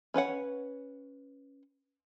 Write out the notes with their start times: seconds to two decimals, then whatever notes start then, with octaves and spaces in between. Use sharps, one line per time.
0.14 C#4 B4 C#5 F#5